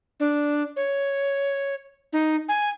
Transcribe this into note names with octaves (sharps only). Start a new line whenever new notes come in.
D4
C#5
D#4
G#5